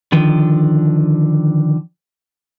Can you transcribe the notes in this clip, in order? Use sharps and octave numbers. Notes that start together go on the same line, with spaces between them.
D3 D#3 F3